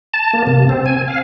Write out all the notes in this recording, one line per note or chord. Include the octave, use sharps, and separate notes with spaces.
A5
A#3
C3
C4
G#5
F5